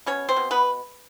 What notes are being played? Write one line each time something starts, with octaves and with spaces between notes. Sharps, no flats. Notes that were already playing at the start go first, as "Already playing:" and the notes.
B2 C#4 C#5
C4 C5
B2
B3 B4